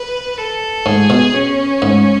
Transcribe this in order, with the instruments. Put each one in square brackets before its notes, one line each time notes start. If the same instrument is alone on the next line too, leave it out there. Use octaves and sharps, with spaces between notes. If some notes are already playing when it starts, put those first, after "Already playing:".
Already playing: [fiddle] B4
A4
[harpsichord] G#2 [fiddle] G#4
[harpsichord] B2
[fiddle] C#4
[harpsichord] G#2